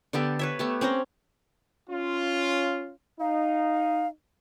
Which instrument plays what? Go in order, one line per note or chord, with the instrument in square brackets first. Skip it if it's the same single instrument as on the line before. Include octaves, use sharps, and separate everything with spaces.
[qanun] D3 B3 G4 A4
B4 C#5 E5
A3 B3 G4
C4 C#4 C5 A#5
[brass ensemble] C#4 F4
[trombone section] D#4 [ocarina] F5